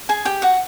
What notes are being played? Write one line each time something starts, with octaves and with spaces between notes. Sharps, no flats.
G#4 G#5
G4 G5
F#4 F#5